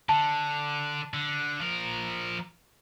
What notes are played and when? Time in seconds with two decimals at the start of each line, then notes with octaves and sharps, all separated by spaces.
0.09 D3 A5
1.14 D3
1.61 F3 A#4